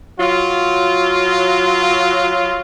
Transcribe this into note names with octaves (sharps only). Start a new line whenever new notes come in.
F#3 F4